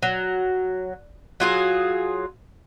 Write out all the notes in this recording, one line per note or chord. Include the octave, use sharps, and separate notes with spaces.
F#3
F#3 F4 G#4